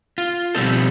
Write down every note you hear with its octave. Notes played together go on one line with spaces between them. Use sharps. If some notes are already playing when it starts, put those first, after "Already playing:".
F4
B2 F3 G3 C4 D#4 A4